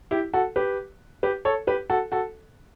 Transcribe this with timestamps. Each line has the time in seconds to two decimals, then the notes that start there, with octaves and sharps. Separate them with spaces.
0.11 E4 G4
0.33 F#4 A4
0.56 G4 B4
1.23 G4 B4
1.45 A4 C#5
1.67 G4 B4
1.90 F#4 A4
2.12 F#4 A4